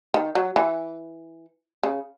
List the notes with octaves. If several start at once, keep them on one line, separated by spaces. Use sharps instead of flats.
D#3
F#3
E3
C#3